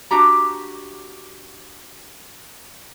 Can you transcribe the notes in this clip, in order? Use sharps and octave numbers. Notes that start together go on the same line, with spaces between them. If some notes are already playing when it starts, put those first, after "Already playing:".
D4 F#4 G4 A#5